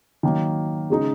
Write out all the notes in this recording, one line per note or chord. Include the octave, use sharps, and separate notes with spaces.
D#3 F#3 A#3
C#3 G#3 D#4